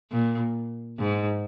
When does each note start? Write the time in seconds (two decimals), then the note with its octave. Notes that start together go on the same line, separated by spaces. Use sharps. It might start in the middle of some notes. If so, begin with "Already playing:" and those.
0.11 A#2
0.99 G#2